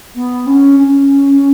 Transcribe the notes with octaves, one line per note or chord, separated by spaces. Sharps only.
B3
C#4
C#4